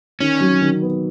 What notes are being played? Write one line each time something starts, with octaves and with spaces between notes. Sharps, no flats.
D#3 C#4
F#3
D#3
B3